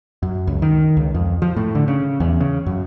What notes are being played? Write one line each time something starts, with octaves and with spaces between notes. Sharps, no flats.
F#2
C#2
D#3
C#2
F2
F3
A2
D3
C#3
E2
C#3
F#2